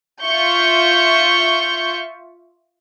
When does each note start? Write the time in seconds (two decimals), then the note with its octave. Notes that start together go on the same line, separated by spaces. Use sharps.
0.22 F4 E5 C#6 G6